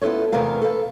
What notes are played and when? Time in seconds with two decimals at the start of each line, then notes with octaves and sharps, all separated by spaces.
0.02 B3 E4 F4 A4 C#5
0.32 E2 C3 A3 B3 A#4 F5
0.61 A4 B4 F5